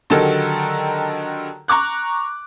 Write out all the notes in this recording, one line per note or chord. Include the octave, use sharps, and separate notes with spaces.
D3 D#3 F#3 G4 A4 A#4
A#5 C#6 D6 F#6